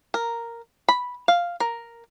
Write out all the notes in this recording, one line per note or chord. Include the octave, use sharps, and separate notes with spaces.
A#4
B5
F5
A#4